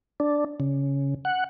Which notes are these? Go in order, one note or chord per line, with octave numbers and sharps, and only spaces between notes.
D4
C#3
F#5